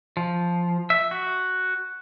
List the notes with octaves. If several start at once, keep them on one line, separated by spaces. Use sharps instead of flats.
F3
E5
F#4